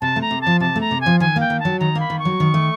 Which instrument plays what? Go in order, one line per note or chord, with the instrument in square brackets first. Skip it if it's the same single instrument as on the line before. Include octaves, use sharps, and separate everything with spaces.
[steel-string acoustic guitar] C3 [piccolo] A5
[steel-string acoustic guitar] A3
[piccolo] A#5
[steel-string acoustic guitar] C3
[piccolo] A5
[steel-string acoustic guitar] F3
[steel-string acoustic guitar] C3 [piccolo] A5
[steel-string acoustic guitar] A3
[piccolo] A#5
[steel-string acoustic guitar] C3
[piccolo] G#5
[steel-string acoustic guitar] F3
[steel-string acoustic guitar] D#3 [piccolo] G#5
[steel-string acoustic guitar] A#3 [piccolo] G5
[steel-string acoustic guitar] D#3
[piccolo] A5
[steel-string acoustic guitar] F#3
[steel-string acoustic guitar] D#3 [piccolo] A#5
[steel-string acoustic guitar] A#3 [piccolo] B5
[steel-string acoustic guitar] D#3
[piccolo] C#6
[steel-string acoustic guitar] F#3
D#3
A3